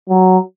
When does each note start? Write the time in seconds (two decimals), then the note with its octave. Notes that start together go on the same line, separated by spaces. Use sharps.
0.09 F#3